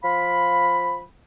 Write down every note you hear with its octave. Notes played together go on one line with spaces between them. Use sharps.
F3 F5 B5